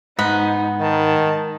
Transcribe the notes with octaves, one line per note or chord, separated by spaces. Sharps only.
G#2 B3 D#4
D#3 A5